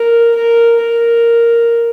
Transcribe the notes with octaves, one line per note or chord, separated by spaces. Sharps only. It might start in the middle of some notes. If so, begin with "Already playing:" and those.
Already playing: A#4
A#4
A#4